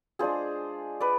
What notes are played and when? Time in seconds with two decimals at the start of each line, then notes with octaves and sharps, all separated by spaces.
0.19 G#3 D4 F4 G#4 C5
1.00 B4 D5